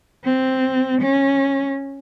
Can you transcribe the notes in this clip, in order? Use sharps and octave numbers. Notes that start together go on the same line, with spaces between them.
C4
C#4